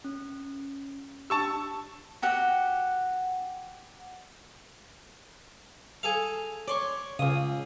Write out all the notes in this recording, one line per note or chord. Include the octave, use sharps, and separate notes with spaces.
C#4
D4 G4 A5 C#6 E6
F#4 G4 F#5
G#4 A4 F5
C#5 D5 C6 C#6
C#2 C#3 F5 D#6